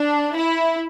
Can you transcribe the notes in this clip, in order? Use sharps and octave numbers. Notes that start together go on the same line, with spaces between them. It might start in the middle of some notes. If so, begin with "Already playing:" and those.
Already playing: D4
E4